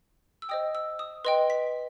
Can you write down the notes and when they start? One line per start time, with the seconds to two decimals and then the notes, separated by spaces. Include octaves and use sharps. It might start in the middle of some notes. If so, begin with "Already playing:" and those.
0.42 E6
0.49 C5 D#5 G5 D#6
0.75 E6
0.99 D#6
1.25 B4 D#5 G5 C6
1.50 B6